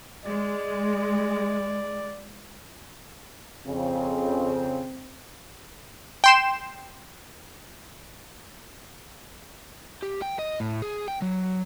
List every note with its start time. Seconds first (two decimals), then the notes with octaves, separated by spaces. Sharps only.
0.24 G#3 D5
3.65 F2 C#3 C4
6.24 G5 C6 E7
10.03 G4
10.22 G5
10.39 D#5
10.60 A2
10.82 G#4
11.08 G5
11.22 F#3